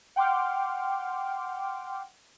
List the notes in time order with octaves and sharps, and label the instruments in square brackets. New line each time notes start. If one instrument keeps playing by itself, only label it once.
[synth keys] F#5 G5 C6 D6 F6